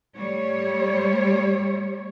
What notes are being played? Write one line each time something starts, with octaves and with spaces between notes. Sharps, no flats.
G3 A3 C#5